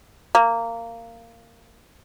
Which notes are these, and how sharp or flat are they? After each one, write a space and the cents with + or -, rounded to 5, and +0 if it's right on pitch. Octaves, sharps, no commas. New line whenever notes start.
A#3 -15